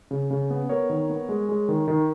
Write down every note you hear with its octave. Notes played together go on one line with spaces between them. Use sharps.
C#3
C#3
B3
B3 A#4 C#5
D#3
B3
G#3
G#3
D#3
D#3